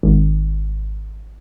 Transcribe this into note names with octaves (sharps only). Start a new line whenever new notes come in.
G#1